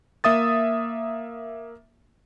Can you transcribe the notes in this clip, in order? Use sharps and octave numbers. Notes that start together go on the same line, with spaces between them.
A#3 E5 D#6 A6